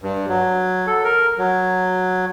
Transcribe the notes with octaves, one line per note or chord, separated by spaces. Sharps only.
G2
F#3
A4
A#4
F#3